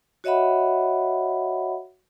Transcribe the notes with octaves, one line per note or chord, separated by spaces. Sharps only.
F#4 C#5 D#5 E5 F#5 B5